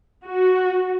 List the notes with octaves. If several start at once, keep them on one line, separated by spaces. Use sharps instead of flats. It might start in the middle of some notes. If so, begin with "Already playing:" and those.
F#4